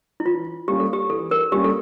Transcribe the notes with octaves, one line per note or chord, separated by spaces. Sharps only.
E4
E3 F4
G3 A#3 C#4 F4 G4
A4
G4
E3 A4
A#4
G3 A#3 C#4 F4 G4
A4